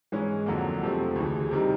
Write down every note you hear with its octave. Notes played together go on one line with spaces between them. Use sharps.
G#2 E3 G#3 C#4
F2 D3 F#3 A#3
F2 C3 F3 A3
D2 C#3 E3
C3 D#3 G3